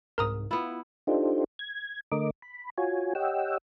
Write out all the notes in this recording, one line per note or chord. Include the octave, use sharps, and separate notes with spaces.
C2 G#2 A#4 A#5 D#6
B3 E4 F4
D4 D#4 F4 G4 A4 C5
G#6
D3 A3 A#4 D#5 D6
B5
F4 F#4 C#5 G#5
G4 C#5 D#5 F#5 G5 E6